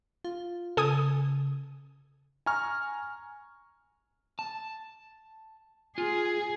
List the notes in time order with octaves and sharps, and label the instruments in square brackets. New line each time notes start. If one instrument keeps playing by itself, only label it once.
[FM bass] F4
[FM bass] C#3 [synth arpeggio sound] A4 G#5 D#6
[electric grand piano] G#5 A#5 C#6 F6
[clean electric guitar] A5
[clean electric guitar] F4 [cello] G#4